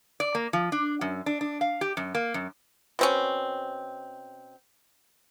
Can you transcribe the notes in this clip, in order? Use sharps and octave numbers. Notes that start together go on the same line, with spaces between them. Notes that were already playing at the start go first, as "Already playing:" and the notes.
D5
A#3
F3
D4
F#2
D4
D4
F5
G4
F#2
A#3
F#2
B2 C4 C#4